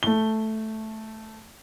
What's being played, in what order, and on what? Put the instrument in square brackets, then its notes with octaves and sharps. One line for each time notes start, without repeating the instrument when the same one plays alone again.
[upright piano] A3 G7